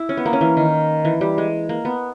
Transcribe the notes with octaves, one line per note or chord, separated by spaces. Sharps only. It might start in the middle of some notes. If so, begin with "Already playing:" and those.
Already playing: E4
C#4
B3
A#3
C#4
E3
D#3
E3
G3
G#3
A#3
B3